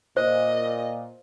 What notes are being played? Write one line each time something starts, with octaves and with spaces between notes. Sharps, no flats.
A#2 C5 D#5